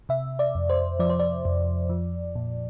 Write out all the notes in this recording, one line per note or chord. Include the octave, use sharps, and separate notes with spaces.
C3 E5
D5
F2
C5
F3 D5
C5
D5
F2
F3
A#2